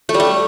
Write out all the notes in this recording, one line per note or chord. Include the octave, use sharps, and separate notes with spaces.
A3
G3
A3